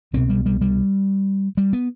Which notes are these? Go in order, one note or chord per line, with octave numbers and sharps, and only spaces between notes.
C2 B2 C4
G3
G3
G3
G3
B3